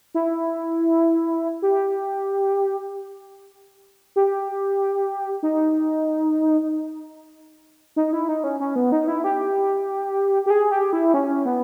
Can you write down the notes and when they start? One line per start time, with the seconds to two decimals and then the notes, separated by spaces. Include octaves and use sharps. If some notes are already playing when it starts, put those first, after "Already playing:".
0.15 E4
1.62 G4
4.16 G4
5.43 D#4
7.96 D#4
8.13 E4
8.29 D#4
8.44 C#4
8.60 C#4
8.76 B3
8.92 D#4
9.08 E4
9.24 G4
10.46 G4
10.50 G#4
10.71 G4
10.93 E4
11.14 C#4
11.45 B3